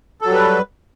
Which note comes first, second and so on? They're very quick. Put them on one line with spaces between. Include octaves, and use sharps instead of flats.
A4 F#3 G3 B4